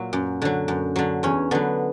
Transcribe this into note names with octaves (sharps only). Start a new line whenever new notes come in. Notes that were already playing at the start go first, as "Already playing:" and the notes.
Already playing: A#2 F#3 A#3
F#2
D3 F#3
F#2
D3 F#3
E2 C#4
D3 F#3 B3